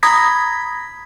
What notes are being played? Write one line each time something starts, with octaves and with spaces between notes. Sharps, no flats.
A#5 B5 D#6 G#6 A#6 B6